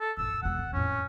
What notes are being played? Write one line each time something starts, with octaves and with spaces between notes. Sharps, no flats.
A4
A1 F#2 E6
E1 A1 F#5
C#4
F2 A2 C#4